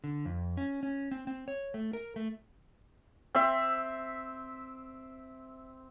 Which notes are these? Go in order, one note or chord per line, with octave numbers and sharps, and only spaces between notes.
D3
F2
C#4
C#4
C4
C4
C#5
A3
A#4
A3
C4 E5